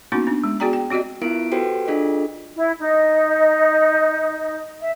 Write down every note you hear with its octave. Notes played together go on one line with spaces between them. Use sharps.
A#3 B3 C#4 D#4 E4 F#4
B3 D4
G#3
B3 F#4 G#4 D5 G5 A#5
G5
C4 F#4 G4 D5 D#5
B3 E4 F4 A#4 D7
F#4 G4 A4 B4 C5 G5
D4 F4 G#4 A4 D#5
E4
D#4
E5